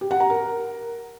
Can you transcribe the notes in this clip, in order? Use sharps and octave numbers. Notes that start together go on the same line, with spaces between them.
G4
F#5
A#5
A#4